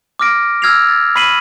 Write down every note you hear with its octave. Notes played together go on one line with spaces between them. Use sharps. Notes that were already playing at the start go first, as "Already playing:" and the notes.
D6 D#6 F6 A#6 D7
E6 F6 G#6 A#6 C7 F7
A6
B5 B6 C7 D#7 F#7